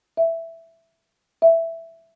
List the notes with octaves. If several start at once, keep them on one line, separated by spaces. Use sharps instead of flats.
E5
E5